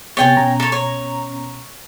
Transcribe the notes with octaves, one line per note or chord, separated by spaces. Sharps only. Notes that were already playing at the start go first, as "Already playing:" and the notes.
C3 B3 C#5 G5 G#5 A6
B2 C#4 A#5
A4 C#5
C#5